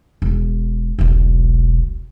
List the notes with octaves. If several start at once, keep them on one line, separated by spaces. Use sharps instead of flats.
E1
E1 B1